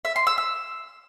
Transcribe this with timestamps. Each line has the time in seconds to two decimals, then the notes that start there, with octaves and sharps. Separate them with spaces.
0.05 E5
0.16 C6
0.27 E6
0.38 E6